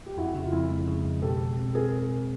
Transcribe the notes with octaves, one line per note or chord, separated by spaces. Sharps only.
G4
F2 E4 F#4
C#3 E4
F4
F2 E4
G#3
C#3
G#3
B2 G4 A4
B2
C4
C4 G#4 A#4
C4
B2